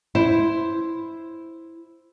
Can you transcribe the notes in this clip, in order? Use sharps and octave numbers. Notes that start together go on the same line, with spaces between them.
E4 C5